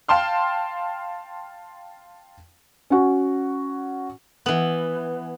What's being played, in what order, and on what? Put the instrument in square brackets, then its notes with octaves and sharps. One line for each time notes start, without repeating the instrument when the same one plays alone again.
[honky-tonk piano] F5 G5 A5 C6 F6
[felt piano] C#4 F#4
[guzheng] E3 B3